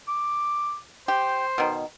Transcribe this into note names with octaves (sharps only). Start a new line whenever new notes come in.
D6
G4 C5
B2 D#3